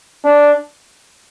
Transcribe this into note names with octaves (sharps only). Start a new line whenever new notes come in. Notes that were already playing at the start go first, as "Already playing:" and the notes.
D4